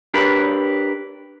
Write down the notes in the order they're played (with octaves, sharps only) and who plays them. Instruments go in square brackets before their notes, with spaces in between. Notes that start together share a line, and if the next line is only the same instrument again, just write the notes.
[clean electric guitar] D4 G4 A#4 B4